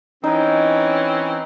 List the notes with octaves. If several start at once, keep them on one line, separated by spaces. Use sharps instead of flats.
E3 C4 C#4 D#4